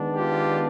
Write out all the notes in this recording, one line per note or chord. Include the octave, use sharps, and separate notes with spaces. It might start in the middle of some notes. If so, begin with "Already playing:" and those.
Already playing: D#3 G#3 B3 D4
F4 G4